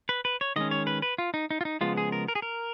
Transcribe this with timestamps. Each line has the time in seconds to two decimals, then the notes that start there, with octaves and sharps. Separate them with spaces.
0.09 B4
0.25 B4
0.41 C#5
0.56 D#3 G#3 C#4 D#5
0.71 C#5
0.87 B4
1.02 B4
1.18 F4
1.34 D#4
1.51 D#4
1.61 F4
1.65 D#4
1.81 C#3 F3 G#3 B3 F4
1.97 G#4
2.12 A#4
2.28 A#4
2.35 G#4
2.42 A#4